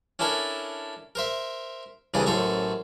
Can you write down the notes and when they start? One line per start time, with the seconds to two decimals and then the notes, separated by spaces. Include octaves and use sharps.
0.19 C#4 D4 E4 A4 A#4
1.15 A#4 C5 E5
2.14 C2 C#3 E3 D4 D5 D#5
2.26 A1 F#2 A4 C5 A#5 C#6